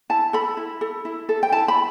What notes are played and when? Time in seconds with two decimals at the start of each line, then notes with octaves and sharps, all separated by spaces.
0.10 E4 A5
0.33 A4 B5
0.57 E4
0.81 A4
1.05 E4
1.29 A4
1.43 G5
1.52 E4 A5
1.68 B5